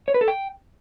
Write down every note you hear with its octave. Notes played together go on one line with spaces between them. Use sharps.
C#5
B4
A4
G5